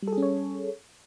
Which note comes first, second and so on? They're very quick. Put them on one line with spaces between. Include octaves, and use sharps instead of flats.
G3 A4 G#4 C#4 C#5